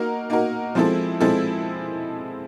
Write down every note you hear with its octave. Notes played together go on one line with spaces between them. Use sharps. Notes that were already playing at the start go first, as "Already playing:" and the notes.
Already playing: A#3 D#4 F#4 A#4
A#3 D#4 F#4 A#4
F3 G#3 C4 E4 A4
F3 G#3 C4 E4 A4